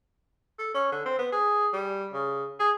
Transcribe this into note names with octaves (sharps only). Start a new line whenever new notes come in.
A4
C#4
D3
C4
B3
G#4
G3
C#3
G#4